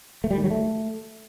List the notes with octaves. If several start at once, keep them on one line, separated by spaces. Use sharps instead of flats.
A3
G3
D#3
F#3
A3